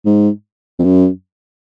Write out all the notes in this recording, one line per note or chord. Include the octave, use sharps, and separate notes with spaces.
G#2
F2
F#2